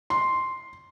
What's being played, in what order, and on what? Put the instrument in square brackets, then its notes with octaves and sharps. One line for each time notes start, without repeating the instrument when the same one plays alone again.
[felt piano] C6